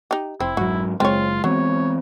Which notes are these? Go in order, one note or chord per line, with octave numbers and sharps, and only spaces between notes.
D#4 G4
F1 C4 E4
G#2 F#3 F#4
F#1 G#3 C4 F4 C#5
E3 F#3 B3 C4 C#5